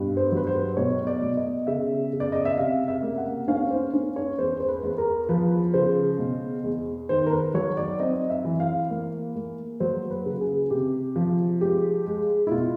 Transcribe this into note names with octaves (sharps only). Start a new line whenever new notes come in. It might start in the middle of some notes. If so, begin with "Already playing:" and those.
Already playing: G2 B2
C5
F#3 B4
C5
B2 C#5
D5
B2
D#5
C#3 E5
C#3
D5
D#5
E5
C3 F5
E5
A#3
F#5
C#4 F5
C5
C#4
C#5
E2 C5
C5
B4
E2
A#4
F3 B4
C#3 C5
B2
E2
D#3 C5
A#4
B4
F#3 C#5
D5
C4 D#5
E5
E3
F5
A#3
A#3
F#3 C5
B4
C#3
G#4
C3 G4
F3
G#3 G4
G#3
E4
B2 F4